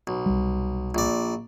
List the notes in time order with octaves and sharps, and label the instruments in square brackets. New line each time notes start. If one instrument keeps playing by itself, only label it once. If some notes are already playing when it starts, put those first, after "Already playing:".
[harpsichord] B1
[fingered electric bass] C2 G3
[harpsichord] A#1 D5